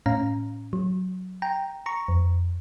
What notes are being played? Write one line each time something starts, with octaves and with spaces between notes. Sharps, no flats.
A2 C#4 F5 A#5
F#3
G5 A#5
A#5 C#6
F2